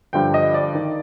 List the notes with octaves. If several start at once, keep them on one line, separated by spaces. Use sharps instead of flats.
G2 D3 F3 G5
D#5
D5
D#3